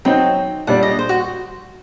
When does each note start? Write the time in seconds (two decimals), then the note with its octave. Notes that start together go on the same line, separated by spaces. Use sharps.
0.05 F#3 C4 D#4 G5
0.67 A#2 G3 D4 F#5
0.83 D#5
0.99 C5
1.09 F#4